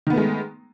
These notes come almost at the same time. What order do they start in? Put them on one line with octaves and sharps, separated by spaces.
D#3 B3 A3 G#3